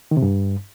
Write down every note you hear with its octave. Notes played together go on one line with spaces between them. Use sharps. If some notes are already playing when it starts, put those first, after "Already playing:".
D#3
C3
G2